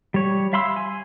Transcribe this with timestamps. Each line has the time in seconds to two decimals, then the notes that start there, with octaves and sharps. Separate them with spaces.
0.14 G3 C#5
0.53 E5 F5 B5 C6 E6
0.76 G#5